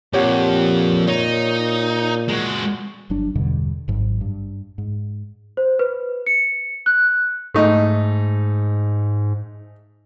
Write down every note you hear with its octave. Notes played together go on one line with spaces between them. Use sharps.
F2 A#2 G4 C#5 F#5
D#4 C#5
G#3 F#4
G1 F#3 D4
E2 G2 B2 D3
G#1 G#2 F#3
G2
G#2
C5
B4
C#7
F#6
G#2 A3 D#4